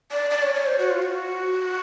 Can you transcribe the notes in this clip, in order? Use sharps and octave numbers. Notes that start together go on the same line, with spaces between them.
D5
D5
C#5
C#5
C5
F#4
F4
F#4